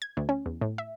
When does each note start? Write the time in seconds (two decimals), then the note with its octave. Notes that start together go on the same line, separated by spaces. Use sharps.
0.02 G#6
0.17 D2
0.29 C#4
0.46 E2
0.61 A2
0.78 E5